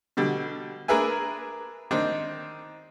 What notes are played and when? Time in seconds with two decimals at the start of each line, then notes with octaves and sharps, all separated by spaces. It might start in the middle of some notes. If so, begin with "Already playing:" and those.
0.17 B2 D3 G3
0.88 D4 G#4 A#4 B4 E5 G#5
1.91 D#3 C4 D4 D#4